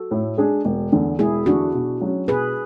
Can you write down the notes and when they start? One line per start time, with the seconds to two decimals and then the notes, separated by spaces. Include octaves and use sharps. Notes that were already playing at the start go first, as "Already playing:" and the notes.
Already playing: F#4 A4
0.11 A2
0.38 G#3 D4 G#4
0.65 E1
0.92 E2 D3
1.19 E1 E4 G#4
1.46 E2 D3 D4 F#4
1.74 B2
2.01 F#3 C#4 F#4
2.28 B2 G#4 B4